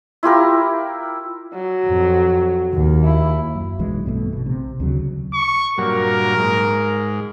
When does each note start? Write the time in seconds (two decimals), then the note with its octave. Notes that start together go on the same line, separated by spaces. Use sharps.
0.23 E4 F4 G4 A#4
1.54 F#3
1.86 F2
2.73 D#2
3.04 E4
3.55 F#2
3.79 B1 B2 E3 G#3
4.06 G2 B2 G3 A3
4.33 B1 B2
4.46 C3
4.80 D2 C#3 F#3
5.34 C#6
5.78 G2 A#2 F#3 A#4
6.38 G#2